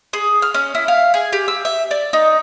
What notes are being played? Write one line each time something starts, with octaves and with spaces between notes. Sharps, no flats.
G#4
F6
C#4
E4
F5
G#4
G4
E6
E5
D5
D#4